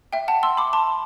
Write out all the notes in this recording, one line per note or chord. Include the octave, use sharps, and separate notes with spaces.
E5 G5
F#5 A5
C6 E6
B5 D6
A5 C6